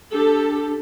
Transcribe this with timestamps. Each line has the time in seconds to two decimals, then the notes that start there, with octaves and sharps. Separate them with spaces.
0.13 D4 G4 A4